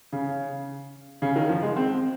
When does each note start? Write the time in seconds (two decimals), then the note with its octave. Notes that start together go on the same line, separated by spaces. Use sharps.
0.13 C#3
1.22 C#3
1.36 D#3
1.49 F3
1.63 G#3
1.76 C4